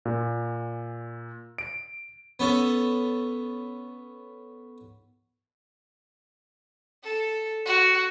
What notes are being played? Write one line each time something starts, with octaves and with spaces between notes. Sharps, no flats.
A#2
D7
B3 C#4 A4
A4
F#4